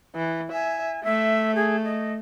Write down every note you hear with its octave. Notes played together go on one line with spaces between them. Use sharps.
E3
E5 G#5
A3 E5
G#4
D#5